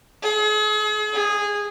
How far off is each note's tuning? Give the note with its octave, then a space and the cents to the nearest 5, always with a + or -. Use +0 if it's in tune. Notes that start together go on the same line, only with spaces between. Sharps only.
G#4 +40
G#4 -15